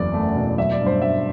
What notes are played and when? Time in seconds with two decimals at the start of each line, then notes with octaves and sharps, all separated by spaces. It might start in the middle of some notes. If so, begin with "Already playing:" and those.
Already playing: F#1 E2 F#3 D5
0.14 A3
0.35 B2
0.57 F#3 E5
0.72 D5
0.80 G2
0.86 C5
1.02 G2 E5